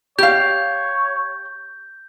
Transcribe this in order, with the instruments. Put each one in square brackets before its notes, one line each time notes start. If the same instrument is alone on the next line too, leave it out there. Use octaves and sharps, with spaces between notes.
[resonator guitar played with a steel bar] G4 F5 [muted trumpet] C#5 [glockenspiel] G6